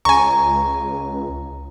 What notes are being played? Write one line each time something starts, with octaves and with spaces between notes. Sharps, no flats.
C#2 G#5 A#5 C#6